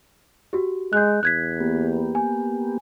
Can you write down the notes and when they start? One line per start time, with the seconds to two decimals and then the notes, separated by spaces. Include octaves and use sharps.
0.53 F#4 G4
0.93 G#3 F#6 G6
1.23 E2 F#6 G#6 B6
1.61 A#3 B3 G4
2.15 G#5